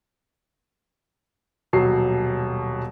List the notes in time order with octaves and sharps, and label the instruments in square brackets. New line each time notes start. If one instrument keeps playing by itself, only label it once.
[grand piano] D#1 B2 F#3 C7